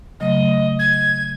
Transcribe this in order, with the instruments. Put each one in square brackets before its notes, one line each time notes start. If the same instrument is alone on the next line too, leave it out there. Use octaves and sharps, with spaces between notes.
[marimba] C#3 F#3 A3 [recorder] D#5
[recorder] G#6